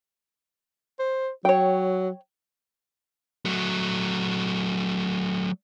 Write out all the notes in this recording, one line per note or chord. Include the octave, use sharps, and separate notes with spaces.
C5
F#3 C#5 G5
F#3 A3